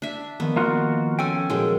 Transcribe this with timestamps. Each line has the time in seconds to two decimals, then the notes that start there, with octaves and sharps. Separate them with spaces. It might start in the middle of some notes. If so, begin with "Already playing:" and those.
0.02 D4 E5
0.40 D#3 F3 B3
0.56 A#3 F4 F#4 D5 D#5
1.19 C#4 A4 G5 G#5
1.50 A#2 F#3 G#3 G#5